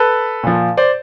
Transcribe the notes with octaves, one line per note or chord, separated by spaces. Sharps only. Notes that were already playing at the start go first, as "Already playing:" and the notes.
Already playing: A4 B4
A#2 F3
C5 D5